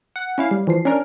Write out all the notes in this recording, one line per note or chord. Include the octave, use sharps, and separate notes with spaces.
F#5
C#4 E4 F5
G3
E3 F3 C7
C#4 D4 A#4